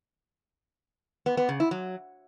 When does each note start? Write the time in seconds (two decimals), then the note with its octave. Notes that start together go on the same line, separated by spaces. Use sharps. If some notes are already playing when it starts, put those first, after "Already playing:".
1.26 B3
1.37 B3
1.49 C#3
1.60 E4
1.71 F#3